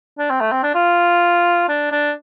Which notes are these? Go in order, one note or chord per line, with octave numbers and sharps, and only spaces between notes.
D4
C4
A3
C4
D4
F4
D4
D4